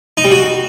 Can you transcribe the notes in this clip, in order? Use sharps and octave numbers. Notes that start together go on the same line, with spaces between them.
D#4
G3
F#4